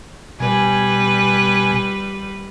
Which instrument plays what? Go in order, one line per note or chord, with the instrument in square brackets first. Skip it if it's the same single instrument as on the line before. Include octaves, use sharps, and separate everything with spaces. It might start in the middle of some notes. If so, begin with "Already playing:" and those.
[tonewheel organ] B2 G#5 [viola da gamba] G3 B4